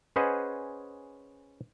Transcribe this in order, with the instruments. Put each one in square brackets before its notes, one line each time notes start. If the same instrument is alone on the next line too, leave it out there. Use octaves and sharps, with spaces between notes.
[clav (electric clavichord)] C#4 G#4 B4 C5 D#5 F#5